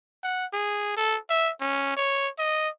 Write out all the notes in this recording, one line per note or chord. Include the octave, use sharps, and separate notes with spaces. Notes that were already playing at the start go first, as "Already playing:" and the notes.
F#5
G#4
A4
E5
C#4
C#5
D#5